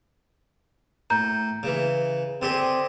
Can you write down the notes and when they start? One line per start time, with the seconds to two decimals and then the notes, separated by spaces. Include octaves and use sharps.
1.10 A2 A#5 G6
1.63 C#3 E3
2.42 D3 C4 G4 G#4